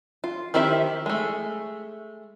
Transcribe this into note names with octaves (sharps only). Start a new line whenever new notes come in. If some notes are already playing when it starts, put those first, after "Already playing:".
F4
D#3 C4 E4 G4 E5
G#3 A3